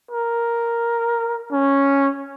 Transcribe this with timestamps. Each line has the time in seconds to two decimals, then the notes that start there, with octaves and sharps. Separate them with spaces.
0.11 A#4
1.52 C#4